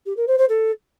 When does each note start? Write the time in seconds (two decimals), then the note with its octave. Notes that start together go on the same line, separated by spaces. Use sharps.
0.06 G4
0.17 A#4
0.27 C5
0.38 C5
0.49 A4